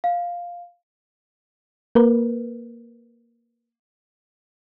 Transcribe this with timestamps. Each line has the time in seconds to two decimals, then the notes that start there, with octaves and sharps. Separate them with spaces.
0.04 F5
1.95 A#3 A#4 B4